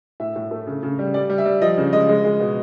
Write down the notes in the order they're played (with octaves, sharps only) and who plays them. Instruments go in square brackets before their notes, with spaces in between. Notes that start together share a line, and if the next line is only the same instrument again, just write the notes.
[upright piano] A2 E5
A2
A3
C#3
C#3
G3
G3 D5
G3
E5
G3
F3 D#5
C#3
G#3 D#5
G#3
G#3
B2